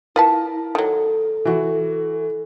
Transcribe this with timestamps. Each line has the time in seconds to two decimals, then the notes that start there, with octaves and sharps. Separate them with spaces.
0.16 E4 F4 A#4 B4 A5
0.75 D#3 F#3 A4
1.45 E3 F#4